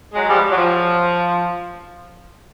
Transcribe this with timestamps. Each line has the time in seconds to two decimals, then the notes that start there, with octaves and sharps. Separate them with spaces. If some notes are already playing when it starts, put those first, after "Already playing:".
0.13 F#3 G#3
0.28 F3 G3
0.51 F#3
0.56 F3